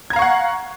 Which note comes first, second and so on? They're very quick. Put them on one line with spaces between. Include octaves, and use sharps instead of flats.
G#6 A#5 F5 C#6 F#5